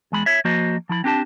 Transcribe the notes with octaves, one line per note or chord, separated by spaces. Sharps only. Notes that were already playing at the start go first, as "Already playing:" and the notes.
E2 G#3 B5
C#5 E5
F3 A#3 F#4 C5 D#5
F3 E4 B5
C4 D4 G4 A5